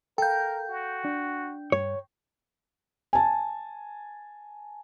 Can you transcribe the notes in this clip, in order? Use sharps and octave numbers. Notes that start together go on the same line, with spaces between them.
A4 A#4 F5 G5 G6
F#4
D4
G2 C#5
G#5 A5